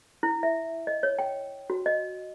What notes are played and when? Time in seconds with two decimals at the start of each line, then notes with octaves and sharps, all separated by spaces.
0.23 E4
0.43 E5
0.87 D#5
1.03 C#5
1.19 G5
1.70 F#4
1.86 D#5